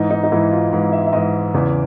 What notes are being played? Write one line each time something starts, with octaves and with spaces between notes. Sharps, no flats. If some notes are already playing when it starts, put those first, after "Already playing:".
Already playing: G#2 E3 D#4
D#4
D#4
G#2 E3 E4
F4
G#2 E3
E5
E5
G#2 E3 D#5
E2 C#3 E3